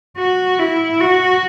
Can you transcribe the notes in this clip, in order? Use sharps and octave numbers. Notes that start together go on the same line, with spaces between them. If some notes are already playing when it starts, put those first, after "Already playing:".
F#4
E4
F#4